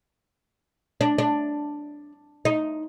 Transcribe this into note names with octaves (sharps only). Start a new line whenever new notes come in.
D4
D4
D#4